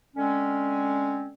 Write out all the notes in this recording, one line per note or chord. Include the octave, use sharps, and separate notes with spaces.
D3 G#3 C4 C#4